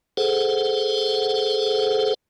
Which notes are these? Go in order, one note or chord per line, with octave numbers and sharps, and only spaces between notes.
G#4 A4 C5 F#5